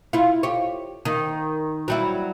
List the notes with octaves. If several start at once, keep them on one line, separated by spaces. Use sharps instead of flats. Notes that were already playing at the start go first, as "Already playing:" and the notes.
E4 F4
G4 C#5
D#3
F#3 G3 E4